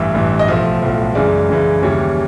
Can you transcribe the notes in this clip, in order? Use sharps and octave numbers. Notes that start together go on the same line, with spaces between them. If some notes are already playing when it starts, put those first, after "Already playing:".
Already playing: A1 G2 E3 E5
A1 G2 E3
D#5
B1 A2 F3 E5
B1 A2 F3
F#2 C#3 E3 G#3 D5
F#2 C#3 E3 G#3
D#2 C#3 E3 G3 C#5